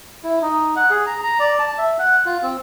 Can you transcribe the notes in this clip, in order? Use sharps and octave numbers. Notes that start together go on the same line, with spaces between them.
E4
D#4
F#5
G#4
A#5
A#5
D5
A5
E5
F#5
F4
C4